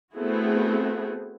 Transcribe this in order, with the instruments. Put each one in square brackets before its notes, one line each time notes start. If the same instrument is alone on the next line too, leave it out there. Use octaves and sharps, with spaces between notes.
[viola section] A3 B3 C4 E4 F#4 G#4